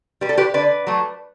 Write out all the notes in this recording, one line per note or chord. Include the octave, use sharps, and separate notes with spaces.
G3 B4
A4
G4 B4
D3 B4 D5
F#3 A3